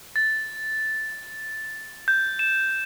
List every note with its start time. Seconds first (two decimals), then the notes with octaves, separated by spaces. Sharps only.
0.16 A6
2.08 G6
2.39 E7